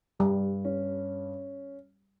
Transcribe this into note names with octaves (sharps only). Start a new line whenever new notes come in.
G2 G3
C#4